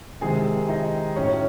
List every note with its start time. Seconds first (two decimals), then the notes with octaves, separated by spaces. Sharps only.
0.21 C3 D#3 G#3 G#4 G#5
0.69 D#4 D#5
1.16 A2 F#3 C#4 C#5